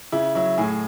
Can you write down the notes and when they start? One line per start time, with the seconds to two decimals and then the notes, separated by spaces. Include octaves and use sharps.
0.12 C#3 E4
0.35 F#3 E4
0.58 A2 G#4